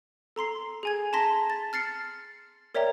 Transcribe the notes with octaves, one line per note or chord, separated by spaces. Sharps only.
A4 A#5 C6 C7
G#4 G#5 G#6
A5 A#5 C6 A#6 B6
A6
F6 A6 C7 C#7
A#4 C#5 D5 E5 G5 A#5